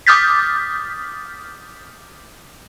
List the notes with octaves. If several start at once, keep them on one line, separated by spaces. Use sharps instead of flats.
D6 D#6 F6 G6 A6 B6